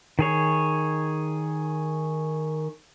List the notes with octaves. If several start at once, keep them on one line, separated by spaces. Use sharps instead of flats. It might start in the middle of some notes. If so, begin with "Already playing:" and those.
D#3 G#4 C#5